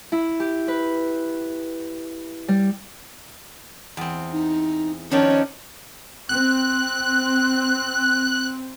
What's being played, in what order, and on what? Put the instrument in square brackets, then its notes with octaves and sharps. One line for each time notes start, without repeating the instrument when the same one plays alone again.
[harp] E4
G4
B4
G3
[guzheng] E2 C4
[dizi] D#4
[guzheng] D#3 F3 D4 [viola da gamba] C#4 [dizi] C#5
[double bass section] C4 [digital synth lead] F#6